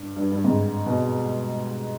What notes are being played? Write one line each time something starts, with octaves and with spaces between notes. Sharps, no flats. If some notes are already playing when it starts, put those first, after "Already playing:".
Already playing: G2
G2
G2
G#2
B2